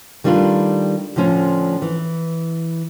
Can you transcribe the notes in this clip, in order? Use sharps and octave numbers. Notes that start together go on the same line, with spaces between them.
D#3 G3 A3 D4 F4 B4
A2 D3 F3 C#4 C5
E3